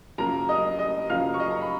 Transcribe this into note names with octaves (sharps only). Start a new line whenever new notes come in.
F#2 C#3 F3 A#3 A#4 A#5
D#5 D#6
D#5 D#6
F#2 C#3 F3 A#3 F5 F6
C#6
D#5 D#6
A#5
B5